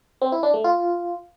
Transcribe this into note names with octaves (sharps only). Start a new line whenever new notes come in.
C4
E4
D4
A3
F4